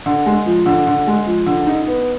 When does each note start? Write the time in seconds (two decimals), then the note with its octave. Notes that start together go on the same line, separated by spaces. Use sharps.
0.06 D3
0.26 G#3
0.46 F3
0.66 D3
0.87 D3
1.07 G#3
1.27 F3
1.46 D3
1.67 D#4
1.87 B3